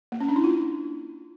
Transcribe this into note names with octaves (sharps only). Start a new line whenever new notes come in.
A#3
C#4
D4
E4
F4